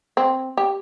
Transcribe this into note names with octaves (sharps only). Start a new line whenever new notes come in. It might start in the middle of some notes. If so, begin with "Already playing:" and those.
C4
G4